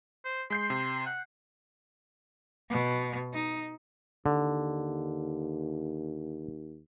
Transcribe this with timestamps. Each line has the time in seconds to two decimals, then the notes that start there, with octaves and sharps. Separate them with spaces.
0.25 C5
0.50 G#3 C6 G6 C7
0.70 C3
1.06 F#5
2.70 B2
3.33 D#4
4.26 D#2 D3